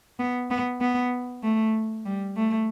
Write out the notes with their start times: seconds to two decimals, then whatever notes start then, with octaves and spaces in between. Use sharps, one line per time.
0.19 B3
0.51 B3
0.81 B3
1.43 A3
2.06 G3
2.36 A3